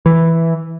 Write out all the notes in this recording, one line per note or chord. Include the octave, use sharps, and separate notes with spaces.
E3